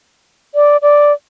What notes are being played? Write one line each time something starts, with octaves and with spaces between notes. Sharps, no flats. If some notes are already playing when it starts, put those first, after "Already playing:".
D5
D5